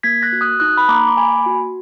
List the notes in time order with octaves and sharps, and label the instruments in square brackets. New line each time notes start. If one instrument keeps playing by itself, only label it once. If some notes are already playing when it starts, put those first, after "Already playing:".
[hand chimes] A#3 G#6 B6
F#6 A#6
F#4
D#6 F#6
D#4 D#6 F#6
B5
A#3 A#5 D6
D6
A#3 G#5 B5
F#4